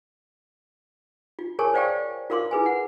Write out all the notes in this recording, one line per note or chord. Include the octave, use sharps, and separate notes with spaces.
F4
G#4 A#4 C#5 G#5 A5 C#6
C5 D5 F5 G5 A5 C#6
F4 A#4 F5 C6 D6
E4 G#4 B4 G#5
F#5